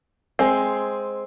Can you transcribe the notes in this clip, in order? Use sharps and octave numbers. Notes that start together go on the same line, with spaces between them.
G#3 C4